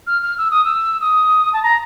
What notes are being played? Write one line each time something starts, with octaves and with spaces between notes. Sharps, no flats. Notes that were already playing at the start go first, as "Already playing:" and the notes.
F6
F6
E6
D#6
E6
D#6
A5
A#5